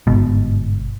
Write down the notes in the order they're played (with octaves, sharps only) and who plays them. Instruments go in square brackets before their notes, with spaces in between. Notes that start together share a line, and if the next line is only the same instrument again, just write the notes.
[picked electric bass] G1 G#2 B2